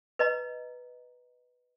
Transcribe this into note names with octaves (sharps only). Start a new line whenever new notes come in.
B4 D#5 A#5